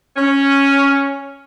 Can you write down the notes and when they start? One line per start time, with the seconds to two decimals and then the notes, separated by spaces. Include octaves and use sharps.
0.16 C#4